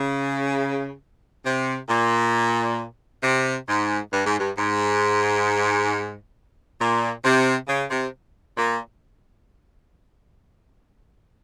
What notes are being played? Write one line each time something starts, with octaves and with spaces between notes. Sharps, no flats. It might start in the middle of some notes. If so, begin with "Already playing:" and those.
Already playing: C#3
C3
A#2
C3
G#2
G2
G#2
G2
G#2
A#2
C3
C#3
C3
A#2